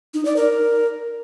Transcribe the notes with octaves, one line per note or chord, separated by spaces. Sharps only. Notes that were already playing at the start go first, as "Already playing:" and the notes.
D#4
D5
A#4